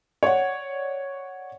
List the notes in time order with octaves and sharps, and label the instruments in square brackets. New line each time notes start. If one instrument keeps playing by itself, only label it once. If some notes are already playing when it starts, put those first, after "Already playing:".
[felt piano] C#5 D5 F#5